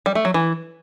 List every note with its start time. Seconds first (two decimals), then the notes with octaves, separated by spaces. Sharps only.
0.06 G3
0.15 A3
0.25 F#3
0.34 E3